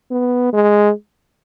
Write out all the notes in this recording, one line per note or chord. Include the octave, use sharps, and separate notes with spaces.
B3
G#3